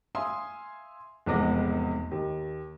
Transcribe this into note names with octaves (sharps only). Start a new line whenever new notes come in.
E5 F5 G#5 C6 D#6
F1 E2 G#2 B3 D6 A#6
D#2